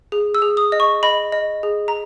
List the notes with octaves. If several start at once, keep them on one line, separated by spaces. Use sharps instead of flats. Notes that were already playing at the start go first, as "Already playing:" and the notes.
G#4
E6
G#4
D#6
D#5
C#6
D#5 B5
D#5
G#4
A#5